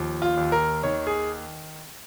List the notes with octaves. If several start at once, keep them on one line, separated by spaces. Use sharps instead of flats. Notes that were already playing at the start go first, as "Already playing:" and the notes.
Already playing: D#2 F3
F4
D#2
A#4
D#3 C#5
G#4